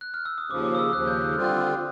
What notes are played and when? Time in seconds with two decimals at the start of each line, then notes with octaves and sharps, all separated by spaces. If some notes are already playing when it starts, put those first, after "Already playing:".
0.01 F#6
0.14 F6
0.25 E6
0.38 D#6
0.50 D#2 C#3 F3 D6
0.64 D6
0.75 D#6
0.79 E6
0.93 D#2 C#3 F3 F#6
1.08 G6
1.22 F#6
1.33 D3 G3 C4 F4 F6
1.44 F#6